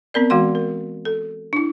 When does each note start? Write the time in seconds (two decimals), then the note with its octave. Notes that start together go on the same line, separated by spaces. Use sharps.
0.14 B3 C4 A#4 D5
0.30 E3 G#3 F#4 F5 C6
0.55 A#4
1.05 A4
1.53 D4 E4